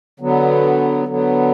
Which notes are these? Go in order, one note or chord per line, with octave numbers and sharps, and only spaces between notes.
D3 F#3 B3
D3 F#3 B3